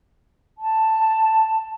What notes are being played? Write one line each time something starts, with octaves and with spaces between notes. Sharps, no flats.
A5